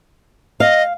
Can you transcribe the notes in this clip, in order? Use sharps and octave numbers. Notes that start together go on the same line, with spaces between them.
D#5 F5